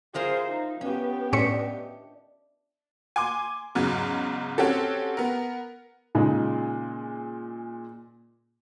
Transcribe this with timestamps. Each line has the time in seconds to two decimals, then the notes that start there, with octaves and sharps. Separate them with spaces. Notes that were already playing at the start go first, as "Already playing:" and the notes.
0.14 E4 F4 G#4 A#4 C5
0.49 D#4
0.81 B3 C#4 G4
1.33 A2 C#4 D4 D#5 E5 C#7
3.16 G#5 C6 D6
3.75 E2 G#2 C#3 F#3
4.58 C4 C#4 F#4 G4 A4
5.17 B3 A#4
6.15 A#2 C#3 G#3 D#4